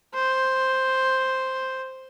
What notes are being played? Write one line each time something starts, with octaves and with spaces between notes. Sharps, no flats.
C5